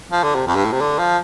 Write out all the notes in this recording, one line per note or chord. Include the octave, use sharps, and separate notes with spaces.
F3
D3
C3
F2
G2
A2
C3
D3
F3